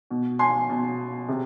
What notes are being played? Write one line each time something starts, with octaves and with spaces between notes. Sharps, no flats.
B2
G#5 C6
B2
C3